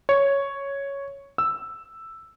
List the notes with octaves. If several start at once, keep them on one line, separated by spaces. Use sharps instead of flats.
C#5
E6